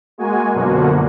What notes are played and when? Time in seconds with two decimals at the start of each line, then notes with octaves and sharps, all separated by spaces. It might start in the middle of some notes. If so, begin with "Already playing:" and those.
0.18 G#3 A#3 F#4 G#5
0.53 F#2 B2 D3 F3 A#3 F#4